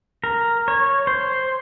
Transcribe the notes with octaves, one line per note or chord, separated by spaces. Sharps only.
A#4
C#5
C5